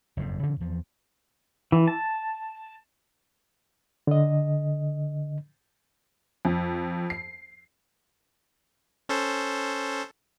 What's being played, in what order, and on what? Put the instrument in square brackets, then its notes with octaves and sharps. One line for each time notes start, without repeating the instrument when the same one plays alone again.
[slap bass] F#1 F2 G#2
C#3 E3 F3 C#4
E2 F3
[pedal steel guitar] E3
A5
[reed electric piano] D3 D#5
[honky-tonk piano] F2
C7
[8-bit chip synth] C#4 A4 C5